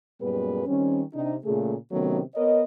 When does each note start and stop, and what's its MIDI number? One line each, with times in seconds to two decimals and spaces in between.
0.22 0.64 42
0.22 0.64 46
0.22 0.64 55
0.22 0.64 59
0.22 0.64 68
0.22 0.64 71
0.66 1.01 51
0.66 1.01 55
0.66 1.01 60
0.66 1.01 61
1.13 1.35 48
1.13 1.35 62
1.13 1.35 63
1.45 1.75 46
1.45 1.75 49
1.45 1.75 57
1.45 1.75 68
1.91 2.20 48
1.91 2.20 51
1.91 2.20 54
1.91 2.20 57
1.91 2.20 59
1.91 2.20 61
2.35 2.62 59
2.35 2.62 70
2.35 2.62 73
2.35 2.62 75